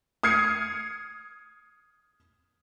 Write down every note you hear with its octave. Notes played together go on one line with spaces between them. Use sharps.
D#6 F6 G#6 C7 C#7